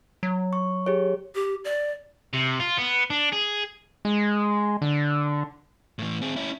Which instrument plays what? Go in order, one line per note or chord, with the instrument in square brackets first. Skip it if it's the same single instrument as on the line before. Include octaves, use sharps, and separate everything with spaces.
[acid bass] F#3
[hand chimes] C#6
G4 G#4 C#5
[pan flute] G4
D5
[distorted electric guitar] C3
F4
B3
D4
G#4
[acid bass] G#3
D3
[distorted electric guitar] A2 E3
C4 G#4
C#4 E4